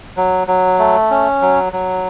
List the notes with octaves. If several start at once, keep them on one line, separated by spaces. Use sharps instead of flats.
F#3
F#3
A3
C#4
F#3
F#3